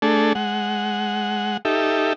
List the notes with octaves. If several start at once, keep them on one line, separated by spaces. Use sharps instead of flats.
A3 D4 G#4 A4
G#3 F#5
D#4 G4 A4 E5